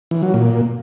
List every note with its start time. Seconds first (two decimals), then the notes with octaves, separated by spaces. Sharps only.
0.11 E3
0.23 F#3
0.34 A#2